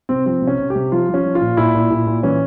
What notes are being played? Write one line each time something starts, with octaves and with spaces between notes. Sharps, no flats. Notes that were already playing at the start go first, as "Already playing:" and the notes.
C3 C4
F3 C4
C3
C#4
C3
G4
C3
F3 F4
F3
C#4
F3
F4
A#2
A#2 E4
A#2
A#2
A#2
E3 C#4